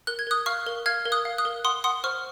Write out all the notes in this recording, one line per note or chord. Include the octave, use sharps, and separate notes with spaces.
A#4 F#6
G#6
A#4 D#6 F#6
F5 C#6 F6
A#4
F5 F6 G#6
A#4
D#6 F#6
F5
D#6 F#6
A#4
F#5 C6 D#6
F#5 C6 D#6
C5 C#6 F6